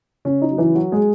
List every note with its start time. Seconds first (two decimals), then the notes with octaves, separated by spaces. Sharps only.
0.25 C#3 C#4
0.42 D#4
0.50 F#3
0.58 E3 E4
0.75 F#3 F#4
0.92 G#3 G#4